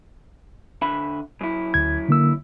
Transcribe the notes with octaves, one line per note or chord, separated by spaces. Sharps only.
D3 E5 B5
F#2 E4
D2 G#6
D3 A#3 E6